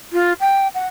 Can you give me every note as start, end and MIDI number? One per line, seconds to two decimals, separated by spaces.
0.13 0.33 65
0.40 0.68 79
0.74 0.87 78